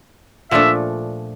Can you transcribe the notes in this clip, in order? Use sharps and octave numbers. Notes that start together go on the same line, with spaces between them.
A#2 F3 A3 D4 E5